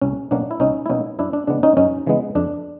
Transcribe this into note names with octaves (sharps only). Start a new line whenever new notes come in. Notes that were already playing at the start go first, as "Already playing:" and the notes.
C2 C#4
B2 F#3 A#3 C#4 D4
E4
C2 C#4 D#4
E4
B2 F#3 A#3 C#4 D#4
F#2 D4 E4
D4
C#3 E3 G#3 B3 D4
C#4 D#4
F#2 C#4 D#4
C#3 E3 G#3 B3
F2 D4